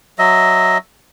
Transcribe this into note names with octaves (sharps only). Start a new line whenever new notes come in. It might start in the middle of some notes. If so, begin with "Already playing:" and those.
F#3 D#5 E5